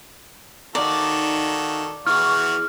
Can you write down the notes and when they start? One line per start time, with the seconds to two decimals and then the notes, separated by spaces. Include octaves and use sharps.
0.75 D#3 D#4 F#4 A4 D5 F5 A#5
2.07 E3 E4 F#4 G#4 C#6 F6